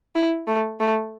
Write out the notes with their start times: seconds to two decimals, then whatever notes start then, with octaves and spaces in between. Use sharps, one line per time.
0.15 E4
0.47 A3
0.80 A3